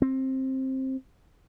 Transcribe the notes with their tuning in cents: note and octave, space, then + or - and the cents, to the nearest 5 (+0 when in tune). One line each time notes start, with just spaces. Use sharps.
C4 +15